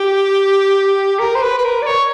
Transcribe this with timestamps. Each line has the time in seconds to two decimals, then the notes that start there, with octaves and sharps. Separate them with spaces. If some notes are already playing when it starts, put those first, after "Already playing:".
Already playing: G4
1.19 A#4
1.35 C5
1.42 B4
1.58 B4
1.64 A#4
1.82 D5
1.86 C#5